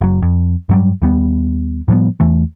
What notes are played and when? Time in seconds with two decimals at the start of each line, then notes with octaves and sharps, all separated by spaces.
0.01 F#1 F#3
0.22 F2
0.69 G2 F#3 G3
1.02 D#2 G3 B3
1.88 A2 F3 G3 B3
2.20 E2 E3 A3